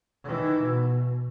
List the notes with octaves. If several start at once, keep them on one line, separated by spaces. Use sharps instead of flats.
D#3 E3
B2